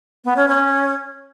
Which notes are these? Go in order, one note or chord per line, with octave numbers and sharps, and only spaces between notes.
B3
C#4
C#4